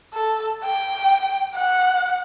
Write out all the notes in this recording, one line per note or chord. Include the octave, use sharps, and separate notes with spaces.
A4
G5
F#5